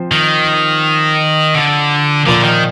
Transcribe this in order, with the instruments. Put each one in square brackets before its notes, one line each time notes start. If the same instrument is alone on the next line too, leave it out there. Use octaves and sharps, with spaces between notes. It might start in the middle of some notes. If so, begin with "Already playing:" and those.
Already playing: [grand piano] F3 C4 C5
[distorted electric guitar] D#3
D3
[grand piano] A#2 F3 A#3 [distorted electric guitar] D3
[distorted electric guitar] D#3